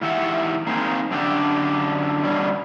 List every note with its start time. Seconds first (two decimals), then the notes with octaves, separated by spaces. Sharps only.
0.01 G#2 E3 G4 E5 F#5
0.67 A#3 C4 D#4 G#4
1.11 F#2 D3 D4 G4
2.23 B2 D3 G3 C#4